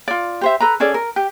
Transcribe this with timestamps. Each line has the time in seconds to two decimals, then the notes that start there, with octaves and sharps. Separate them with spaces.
0.08 F4 D5
0.41 G4 C5 E5
0.61 A4 B4 A#5
0.80 C#4 G#4 A4 D5
0.94 A#4
1.16 G4